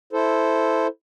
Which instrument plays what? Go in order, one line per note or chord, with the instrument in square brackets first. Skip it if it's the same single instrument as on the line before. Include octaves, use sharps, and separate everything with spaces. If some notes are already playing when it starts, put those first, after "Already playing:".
[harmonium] E4 A4 C5